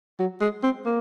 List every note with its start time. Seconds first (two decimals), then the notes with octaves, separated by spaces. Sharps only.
0.19 F#3
0.41 G#3
0.63 C4
0.85 A#3